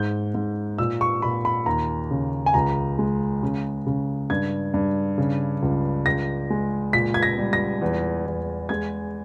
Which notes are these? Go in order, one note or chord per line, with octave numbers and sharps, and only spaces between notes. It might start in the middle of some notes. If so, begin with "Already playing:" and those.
Already playing: G#2 G#3 G6
G#2
A#2 E6
C#6
A#2 B5
B5
D#2 A#5
C#3
G#5
C#2 A#5
G#3
C#3
C#3
G2 G#6
G2
C#3
C#2
C#2 A#6
G#3
A#2 B6
G#6
A#6
G3
A#6
E2
E2
G#3 G#6